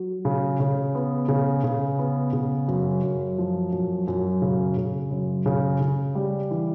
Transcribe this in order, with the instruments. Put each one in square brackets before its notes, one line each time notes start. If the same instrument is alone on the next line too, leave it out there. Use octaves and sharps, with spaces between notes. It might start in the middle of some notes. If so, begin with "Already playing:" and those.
Already playing: [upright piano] F#3
C#3
C#3
B3
C#3
C#3
B3
C#3
F#2
F#2
F3
F#2
F#2
C#3
C#3
F#2
C#3
C#3
G3
E3